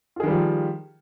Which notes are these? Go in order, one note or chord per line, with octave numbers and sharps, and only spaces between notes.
D#3 F3 G3 F4 G#4